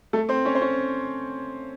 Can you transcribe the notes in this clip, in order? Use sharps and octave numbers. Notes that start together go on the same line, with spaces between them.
A3 A4
C4 C5
C#4 C#5
C5
C#4 C#5